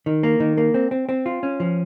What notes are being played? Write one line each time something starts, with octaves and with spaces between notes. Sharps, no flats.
D#3
A#3
D#3
A#3
C4
C4
C4
F4
C#4
F3